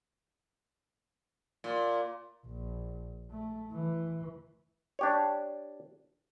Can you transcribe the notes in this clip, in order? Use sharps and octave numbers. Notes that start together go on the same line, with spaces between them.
A#2
A#1
A3
E3
D4 G4 C#5